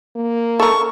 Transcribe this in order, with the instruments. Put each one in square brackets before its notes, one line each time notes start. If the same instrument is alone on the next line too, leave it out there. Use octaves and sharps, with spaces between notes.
[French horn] A#3
[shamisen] A4 A#4 [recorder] C#6